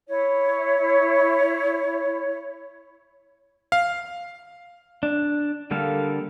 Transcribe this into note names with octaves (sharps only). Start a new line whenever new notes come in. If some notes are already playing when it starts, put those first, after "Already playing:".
E4 C#5
F5
D4
D3 G3 A#3 A4 F5